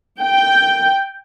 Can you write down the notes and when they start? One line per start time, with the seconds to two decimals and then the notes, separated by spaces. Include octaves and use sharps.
0.20 G5